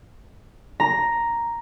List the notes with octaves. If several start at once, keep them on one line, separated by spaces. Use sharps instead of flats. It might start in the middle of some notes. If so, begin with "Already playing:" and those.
A#5